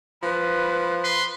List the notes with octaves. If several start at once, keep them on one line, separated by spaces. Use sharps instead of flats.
F3 B4
B4 C6